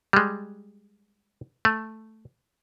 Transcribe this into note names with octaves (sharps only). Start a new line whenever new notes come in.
G3 G#3
A3